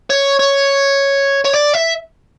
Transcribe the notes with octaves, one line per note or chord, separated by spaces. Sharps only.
C#5
C#5
C#5
D5
E5